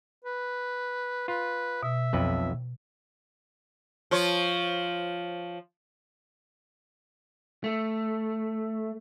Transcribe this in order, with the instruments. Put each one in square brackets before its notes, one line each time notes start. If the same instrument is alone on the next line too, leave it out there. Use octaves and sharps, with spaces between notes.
[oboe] B4
[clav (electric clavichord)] F4 [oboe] B4
[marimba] B2 [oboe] E5
[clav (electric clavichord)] B1 F2 B4
[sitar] F3 F4 C#5
[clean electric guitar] A3